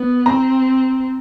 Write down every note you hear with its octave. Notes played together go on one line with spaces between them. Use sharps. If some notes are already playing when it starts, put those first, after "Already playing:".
Already playing: B3
C4 A#5